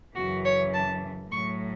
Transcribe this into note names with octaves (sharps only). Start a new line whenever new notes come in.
F#2 C#3 E3 F#4
C#5
A5
A2 F#3 C#6